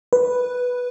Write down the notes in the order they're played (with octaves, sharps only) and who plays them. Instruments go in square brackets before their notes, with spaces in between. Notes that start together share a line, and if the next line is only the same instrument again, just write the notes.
[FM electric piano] B4